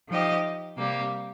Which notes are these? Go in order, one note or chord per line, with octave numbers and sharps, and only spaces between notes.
F3 D#4 G4 D#5
C3 G3 A#3 G4